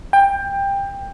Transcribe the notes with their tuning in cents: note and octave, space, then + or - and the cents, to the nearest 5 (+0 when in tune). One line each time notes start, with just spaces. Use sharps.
G5 +20